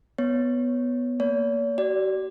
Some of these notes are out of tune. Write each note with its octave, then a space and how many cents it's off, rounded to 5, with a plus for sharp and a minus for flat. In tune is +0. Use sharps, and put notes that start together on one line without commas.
B3 +0 C#5 +5
A#3 +0 C#5 +45
F#4 +45 D5 +0